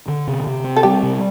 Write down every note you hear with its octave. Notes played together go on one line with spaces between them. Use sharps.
D3
C3
C3
C4
A4
G3 G4
C3